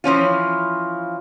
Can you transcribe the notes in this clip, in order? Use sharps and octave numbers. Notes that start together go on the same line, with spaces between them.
E3 F3 C#4 F4